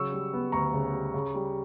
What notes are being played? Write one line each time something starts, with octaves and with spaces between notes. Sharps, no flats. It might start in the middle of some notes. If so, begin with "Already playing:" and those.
Already playing: C#3 F#3 C#6 E6
G3
B3
D2 A#5 C#6
C#3
G3
C#3
G3